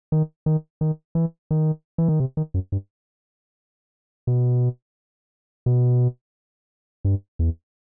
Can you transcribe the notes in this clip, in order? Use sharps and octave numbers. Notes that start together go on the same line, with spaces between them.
D#3
D#3
D#3
E3
D#3
E3
D#3
C3
D#3
F#2
G2
B2
B2
G2
E2